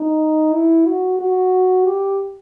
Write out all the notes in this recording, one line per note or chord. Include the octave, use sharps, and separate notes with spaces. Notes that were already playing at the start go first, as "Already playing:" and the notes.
Already playing: D#4
E4
F#4
F#4
G4